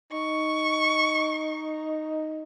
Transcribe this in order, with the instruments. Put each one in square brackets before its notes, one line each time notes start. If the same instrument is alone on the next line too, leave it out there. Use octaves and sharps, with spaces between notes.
[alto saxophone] D#4 [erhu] C#6